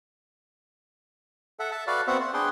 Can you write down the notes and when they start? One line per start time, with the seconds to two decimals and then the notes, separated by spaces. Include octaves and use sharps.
1.59 A4 E5 F#5
1.71 E5 A5
1.87 F#4 A4 B4 D5 F5
2.07 B3 C4 F#4 C5 E5 F#5
2.20 C5
2.34 D4 G#4 B4 G5 C6